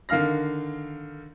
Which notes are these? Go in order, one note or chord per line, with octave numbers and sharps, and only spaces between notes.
D3 D#3 F5 F6 A#6